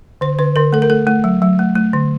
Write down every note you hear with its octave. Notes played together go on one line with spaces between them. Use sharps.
D3 C5
D3 B4
D3 A#4
A3 A4
A#4
A3 A4
A3
F#3
F#3
A3
A3
D3